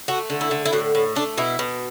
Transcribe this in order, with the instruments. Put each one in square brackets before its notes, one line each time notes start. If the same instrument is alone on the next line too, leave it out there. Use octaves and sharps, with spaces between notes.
[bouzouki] A3 F#4
D3
E4
D3
E4
A2 F#4
A2
A3 D4
B2 E4
B2